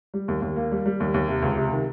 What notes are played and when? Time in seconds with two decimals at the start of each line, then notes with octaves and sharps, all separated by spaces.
0.14 G3
0.28 D#2
0.42 D#2
0.56 A#3
0.71 G3
0.86 G3
1.00 D#2
1.14 D#2
1.28 C3
1.42 C#2
1.57 C3
1.72 D#3